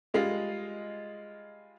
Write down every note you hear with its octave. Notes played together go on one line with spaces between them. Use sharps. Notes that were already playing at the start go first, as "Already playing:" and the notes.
G3 G#3 F4 D#5 C7